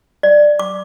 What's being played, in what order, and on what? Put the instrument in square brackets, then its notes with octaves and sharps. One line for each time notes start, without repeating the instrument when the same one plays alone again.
[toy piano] D5
D6